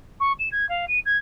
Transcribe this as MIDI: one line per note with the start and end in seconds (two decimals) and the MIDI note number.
0.20 0.33 85
0.39 0.49 100
0.52 0.68 92
0.69 0.86 77
0.88 0.99 99
1.06 1.17 92